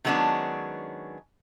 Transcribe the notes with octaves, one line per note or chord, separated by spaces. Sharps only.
D#3 F#3 G#3 B3 C#4 D4